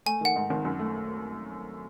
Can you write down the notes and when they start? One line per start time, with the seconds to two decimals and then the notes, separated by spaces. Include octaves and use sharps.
0.06 A3 G#5
0.21 D#3 F#5
0.36 G#2
0.50 G#1
0.65 F#2
0.79 A3